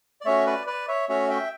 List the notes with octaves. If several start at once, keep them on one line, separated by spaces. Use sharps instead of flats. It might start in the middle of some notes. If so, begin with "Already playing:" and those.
D5
A3 C#4 F#4 C#5 E5
B4 D5
B4 D5
C#5 E5
A3 C#4 F#4 C#5 E5
E5 G5